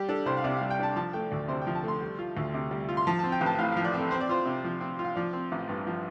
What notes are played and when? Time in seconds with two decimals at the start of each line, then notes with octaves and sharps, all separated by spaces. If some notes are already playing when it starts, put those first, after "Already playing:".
Already playing: G3 G4
0.09 D4 A4
0.26 C2 C5
0.37 F5
0.44 C3 D5
0.57 G3 F5
0.71 G5
0.79 D4 A5
0.96 F3 A5
1.13 A3 G5
1.31 D2 D5
1.48 C3 C5
1.62 G5
1.67 F3
1.75 A5
1.84 A3 C6
2.01 G3
2.19 F4
2.37 D2
2.54 C3
2.71 G3
2.89 F4
2.97 C6
3.07 F3 A5
3.19 C4 A5
3.32 G5
3.41 A1
3.46 A5
3.58 A2 F5
3.72 F3 F5
3.84 D5
3.94 C4 A4
4.11 C4 C5
4.21 D5
4.29 F4 C5
4.46 C3
4.64 F3
4.81 C4
4.99 F4
5.04 F5
5.16 F3 D5
5.33 C4
5.52 A1
5.69 G2
5.87 F3